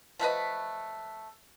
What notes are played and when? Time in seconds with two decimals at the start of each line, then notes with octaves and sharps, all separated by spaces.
0.19 F3 A3 B4 D#5